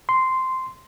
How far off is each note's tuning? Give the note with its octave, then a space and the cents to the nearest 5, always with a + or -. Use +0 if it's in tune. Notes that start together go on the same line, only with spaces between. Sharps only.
C6 -10